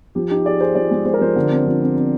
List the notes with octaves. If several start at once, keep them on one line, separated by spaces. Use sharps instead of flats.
F3 G4
D#4 G4
G#4 D5
G#4 C5
F3 D5
G#3
G#3 C5
A#4
F3 C5
D3
C4
F3
C4
C4